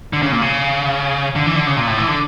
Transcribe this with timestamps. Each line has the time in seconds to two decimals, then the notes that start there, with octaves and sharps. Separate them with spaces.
0.13 D3
0.22 C#3
0.32 A#2
0.42 C#3
1.36 D3
1.46 E3
1.56 D3
1.67 C#3
1.77 A#2
1.87 A2
1.98 E3
2.08 D3